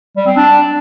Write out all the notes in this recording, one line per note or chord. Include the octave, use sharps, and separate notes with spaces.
G3
C4
D4